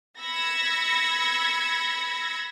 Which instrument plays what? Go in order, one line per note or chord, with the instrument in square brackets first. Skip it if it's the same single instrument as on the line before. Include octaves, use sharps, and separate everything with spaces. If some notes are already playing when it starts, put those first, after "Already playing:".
[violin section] B5 E6 G#6 A#6 C#7